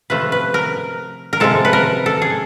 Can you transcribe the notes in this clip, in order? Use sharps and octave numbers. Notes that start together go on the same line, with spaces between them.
C3 F3 A3 B4
B4
A#4
A#4
C3 F3 G#3 A4
B4
A#4
A4
G#4